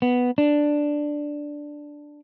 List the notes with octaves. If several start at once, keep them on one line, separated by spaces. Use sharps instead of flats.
B3
D4